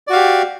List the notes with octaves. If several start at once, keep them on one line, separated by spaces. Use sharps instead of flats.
F#4 G4 D5 F5